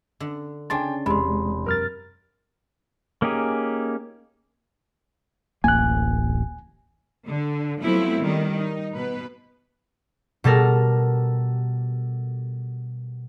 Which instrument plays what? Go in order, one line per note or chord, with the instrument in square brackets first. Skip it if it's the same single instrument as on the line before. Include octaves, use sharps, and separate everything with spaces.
[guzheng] D3
[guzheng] C#3 D4 [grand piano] G5 G#5 C6 [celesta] A6
[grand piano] E1 [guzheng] C3 [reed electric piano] G#3 [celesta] B5 C6
[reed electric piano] F#2 F6 A6 [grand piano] A#4
[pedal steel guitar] A#3 C#4 D#4 G4 G#4
[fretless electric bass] D1 A1 A#3 [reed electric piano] G#5 F#6
[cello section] D3
F3 F#3 A3 B3 C4 E4
D#3 G3
D#4
B2 B4
[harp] B2 G3 A4 A#4